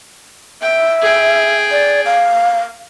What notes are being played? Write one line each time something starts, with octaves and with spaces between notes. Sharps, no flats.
E5 G5
G#4 G5
D5
F5